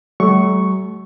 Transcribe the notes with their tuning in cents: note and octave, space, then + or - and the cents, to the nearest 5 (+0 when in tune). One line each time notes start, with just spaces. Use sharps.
F#3 +40 A3 -40 C#6 +0